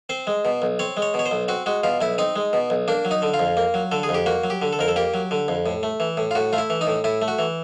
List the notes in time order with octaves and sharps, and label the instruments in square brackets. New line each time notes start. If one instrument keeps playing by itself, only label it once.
[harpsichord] C4 C5
G#3
B2
B1
C4 C#5
G#3
C#5
B2 C#5
C5
B1
C4 F#4
G#3 F#4
B2 F4
B1 E4
C4 D#4
G#3
B2
B1
A#3 D4
F#3
D#4
D3
F4
F2
A#3
F#3
D3 A4
G#4
F2
G4
A#3 F#4
F#3
G4
D3
A4
F2 A#4
A4
A#3 G4
F#3
D3
F2
A2
A3
E3
A2
F4
A2 F#4
A3 F4
E4
E3
D#4
A2
A2 E4
A3
F#4
E3